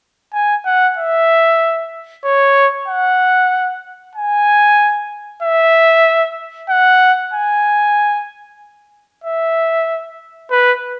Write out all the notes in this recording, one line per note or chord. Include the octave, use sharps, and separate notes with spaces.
G#5
F#5
E5
C#5
F#5
G#5
E5
F#5
G#5
E5
B4